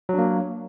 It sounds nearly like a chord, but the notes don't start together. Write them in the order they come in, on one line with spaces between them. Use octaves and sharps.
F#3 D4 A#3